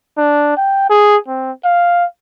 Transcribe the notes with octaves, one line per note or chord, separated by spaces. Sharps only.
D4
G5
G#4
C4
F5